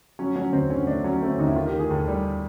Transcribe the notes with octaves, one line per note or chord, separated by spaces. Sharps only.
F#3 C#4
F#3 C#4
D#2 C4
D3 C#4
A3 D4
F#3 C#4
A3 C4
C#4
D#2 D#4
E4
D#3 F4
G4
D#3
G#4
D#2 A4
G3